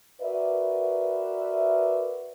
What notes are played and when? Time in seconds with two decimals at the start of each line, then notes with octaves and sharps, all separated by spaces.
0.22 F#4 A#4 B4 D5 E5